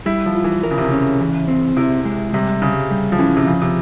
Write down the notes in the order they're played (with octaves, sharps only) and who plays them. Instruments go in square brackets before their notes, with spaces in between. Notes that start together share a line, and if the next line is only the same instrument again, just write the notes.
[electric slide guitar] G3 [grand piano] E4
[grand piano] F3
[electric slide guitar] F4
[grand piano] E3
[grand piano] E3 [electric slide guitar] A#4
[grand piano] C#3
C3
C#3
[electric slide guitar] C#4
E3
C4
[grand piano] C3 [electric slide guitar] E4
[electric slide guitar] G#3
[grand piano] C3 [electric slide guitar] G3
[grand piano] C#3 [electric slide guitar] G4
[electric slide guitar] G3
[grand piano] F3
[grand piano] E3 [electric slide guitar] C#4
[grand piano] C3
[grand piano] C#3 [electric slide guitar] F3
[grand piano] C3